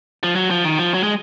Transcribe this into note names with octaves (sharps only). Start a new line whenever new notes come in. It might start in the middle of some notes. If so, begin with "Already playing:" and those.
F3
F#3
F3
D#3
F3
F#3
G#3